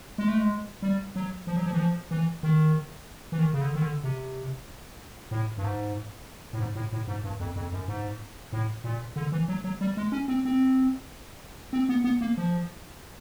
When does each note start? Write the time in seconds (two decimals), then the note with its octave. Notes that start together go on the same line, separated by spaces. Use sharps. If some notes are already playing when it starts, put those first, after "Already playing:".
0.18 G#3
0.28 A3
0.38 G#3
0.82 G3
1.16 F#3
1.47 F3
1.56 F#3
1.66 F3
1.73 E3
1.79 F3
2.11 E3
2.43 D#3
3.32 E3
3.39 D#3
3.53 C#3
3.61 D3
3.75 D#3
3.82 D3
4.04 C3
5.31 A2
5.58 G2
5.64 G#2
6.53 A2
6.59 G#2
6.75 A2
6.93 A2
7.08 G#2
7.24 G2
7.40 F2
7.56 F2
7.73 F#2
7.88 G#2
8.53 A2
8.84 A#2
9.16 D3
9.32 E3
9.48 F#3
9.64 F#3
9.81 G3
9.97 G#3
10.12 C#4
10.28 C4
10.45 C4
11.73 C4
11.89 B3
12.04 B3
12.21 A#3
12.37 F3